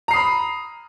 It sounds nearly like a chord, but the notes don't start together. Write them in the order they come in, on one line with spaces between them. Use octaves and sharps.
A#5 C7 D#6 B5